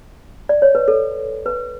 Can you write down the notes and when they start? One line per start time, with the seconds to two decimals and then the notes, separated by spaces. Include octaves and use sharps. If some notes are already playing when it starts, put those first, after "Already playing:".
0.49 D5
0.62 C#5
0.75 B4
0.88 A4
1.46 B4